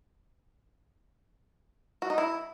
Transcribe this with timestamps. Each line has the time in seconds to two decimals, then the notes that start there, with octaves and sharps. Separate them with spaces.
2.02 F#4
2.10 D#4
2.18 E4